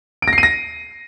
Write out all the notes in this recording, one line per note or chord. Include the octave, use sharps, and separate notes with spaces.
D7
A#6
C7
D#7
A#6